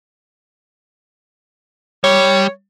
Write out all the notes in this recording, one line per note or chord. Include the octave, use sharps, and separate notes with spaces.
G3 C#5